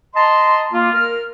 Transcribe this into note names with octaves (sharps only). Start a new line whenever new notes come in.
D#5 A5 A#5 C6
A#3 F4
A#4 F6